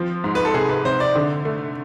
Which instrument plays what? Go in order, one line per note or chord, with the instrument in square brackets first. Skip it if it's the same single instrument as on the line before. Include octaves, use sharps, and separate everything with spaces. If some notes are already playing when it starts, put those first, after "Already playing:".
Already playing: [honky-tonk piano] F3 C4 [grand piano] F4
[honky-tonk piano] G#2
[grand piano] B4
A4
[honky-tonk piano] C3 [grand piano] G#4
[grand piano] B4
[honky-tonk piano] C3 [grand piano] C5
[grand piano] D5
[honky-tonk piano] D3
A3